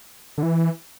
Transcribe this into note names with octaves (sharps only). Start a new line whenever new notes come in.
D3
E3